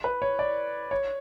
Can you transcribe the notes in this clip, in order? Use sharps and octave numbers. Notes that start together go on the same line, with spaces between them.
B4
C#5
D5
C#5